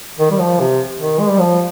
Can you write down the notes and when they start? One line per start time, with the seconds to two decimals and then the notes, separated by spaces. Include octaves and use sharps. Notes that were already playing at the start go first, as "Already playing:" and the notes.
0.19 D#3
0.31 G3
0.39 F3
0.60 C3
0.99 D#3
1.19 G#3
1.30 G3
1.40 F3